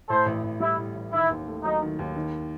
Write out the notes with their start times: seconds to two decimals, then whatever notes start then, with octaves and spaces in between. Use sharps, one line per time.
0.09 A2 A4 C5
0.26 A1
0.43 A1
0.60 G3 E4
0.77 A2
0.95 A1
1.13 D#3 E4
1.30 D#2
1.47 A3
1.63 F#3 D#4
1.82 D#3
1.99 D#2
2.15 D#3